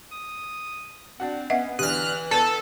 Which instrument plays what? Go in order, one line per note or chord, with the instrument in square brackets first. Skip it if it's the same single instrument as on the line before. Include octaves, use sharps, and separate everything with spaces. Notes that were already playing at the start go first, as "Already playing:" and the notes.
[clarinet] D#6
[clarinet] C4 [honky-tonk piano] D4 F#4 F#5
[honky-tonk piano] B3 [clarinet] C#4 [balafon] D#5 E5 F#5
[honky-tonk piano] E2 D3 [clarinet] E3 [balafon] G4 [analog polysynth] F6 F#6
[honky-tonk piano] E2 A6 D#7 [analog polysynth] A4 [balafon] B4 A5